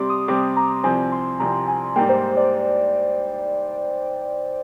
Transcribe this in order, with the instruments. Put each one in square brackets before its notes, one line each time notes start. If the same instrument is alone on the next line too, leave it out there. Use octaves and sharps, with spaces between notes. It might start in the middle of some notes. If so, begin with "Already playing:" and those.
Already playing: [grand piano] C3 G3 C4 [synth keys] C6 D6
[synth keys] D#6
[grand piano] C3 G3 C4 [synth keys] D6
[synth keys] A#5
[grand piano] C2 C3 F3 C4 [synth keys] G#5
[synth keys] C6
[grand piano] C2 C3 F3 C4 [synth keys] A#5
[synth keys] G#5
[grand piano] G#2 G3 A#3 [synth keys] G5
[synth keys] C5
C5
D5